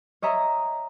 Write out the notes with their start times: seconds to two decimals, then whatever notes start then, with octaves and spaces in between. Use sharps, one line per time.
0.22 C#5 D#5 E5 A#5